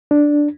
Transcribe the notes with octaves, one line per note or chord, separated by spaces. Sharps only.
D4